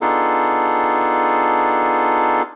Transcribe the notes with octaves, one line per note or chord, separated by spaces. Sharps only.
B3 D4 D#4 F4 G#4 A4